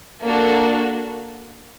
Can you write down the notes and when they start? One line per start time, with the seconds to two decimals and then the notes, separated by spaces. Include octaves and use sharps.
0.24 A#3 D4 F#4 A4